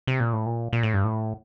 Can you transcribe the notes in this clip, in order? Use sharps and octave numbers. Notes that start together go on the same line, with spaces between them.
C3
A#2
A2
A#2
A#2
A2
G2
A2